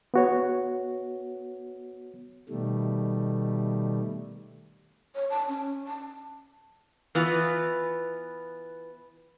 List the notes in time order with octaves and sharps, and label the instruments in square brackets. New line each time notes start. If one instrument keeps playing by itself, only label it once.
[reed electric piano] B3 F#4 C#5
[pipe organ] B2 D#3 G3 A3
[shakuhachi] C#5
A5
C#4
A5
[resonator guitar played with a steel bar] E3 B3 F4 B4